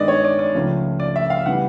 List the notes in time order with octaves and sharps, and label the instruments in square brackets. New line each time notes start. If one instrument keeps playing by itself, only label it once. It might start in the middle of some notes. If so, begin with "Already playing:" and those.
Already playing: [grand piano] G2 D#3 G#3 B3 D5 D#5
C#5
D5
D5
C#2 C#3 F3 A3
D5
E5
F5
C#3 E3 G3 B3 F#5